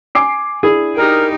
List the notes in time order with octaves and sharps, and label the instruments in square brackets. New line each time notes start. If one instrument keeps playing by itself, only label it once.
[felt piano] G#5 D6 C7
[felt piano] D4 E4 [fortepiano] G#4
[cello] D#4 G4 [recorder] A#4